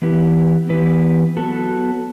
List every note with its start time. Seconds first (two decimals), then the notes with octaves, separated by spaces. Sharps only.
0.02 E3 B3 E4 G4 B4
0.69 E3 B3 E4 G4 B4
1.37 F#3 B3 F#4 A4